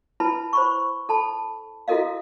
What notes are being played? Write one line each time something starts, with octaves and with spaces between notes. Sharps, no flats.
E4 B4 A5 B5
C5 B5 C#6
A4 A5 B5
E4 F#4 A4 A#4 D#5 F5